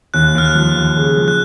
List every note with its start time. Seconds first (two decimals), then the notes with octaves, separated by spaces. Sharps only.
0.14 D#2 F#6
0.35 D#2 F6
0.45 F#6
0.55 F3
0.76 D#2
0.97 C#3
1.17 F3
1.28 F#6